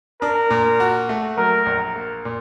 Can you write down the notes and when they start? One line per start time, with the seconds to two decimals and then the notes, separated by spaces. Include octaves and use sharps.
0.22 D4 A#4
0.50 A#2
0.80 F#4
1.09 A3
1.37 F#3 A#4
1.66 A#1
1.96 A#3
2.25 A#2